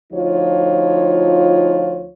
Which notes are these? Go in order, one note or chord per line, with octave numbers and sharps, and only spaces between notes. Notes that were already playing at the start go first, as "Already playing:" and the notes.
D2 F3 D#4 F4 C#5